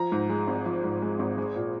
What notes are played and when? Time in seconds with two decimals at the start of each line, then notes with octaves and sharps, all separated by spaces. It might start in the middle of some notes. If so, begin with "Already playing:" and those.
Already playing: F3 A#5
0.12 G#2
0.30 G#3
0.47 G#1
0.66 F3
0.84 G#2
1.02 G#3
1.19 G#1
1.38 G#3
1.56 A#2